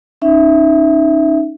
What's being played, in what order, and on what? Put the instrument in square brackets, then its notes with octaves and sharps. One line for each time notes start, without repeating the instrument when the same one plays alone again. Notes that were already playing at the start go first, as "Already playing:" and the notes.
[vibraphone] C#4 D#4 E5